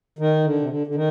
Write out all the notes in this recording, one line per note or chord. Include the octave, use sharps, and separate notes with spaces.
D#3
D3
C3
D3
D3
D#3